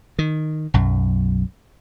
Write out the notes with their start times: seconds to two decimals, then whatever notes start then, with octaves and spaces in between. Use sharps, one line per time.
0.19 D#3
0.74 B1 F#2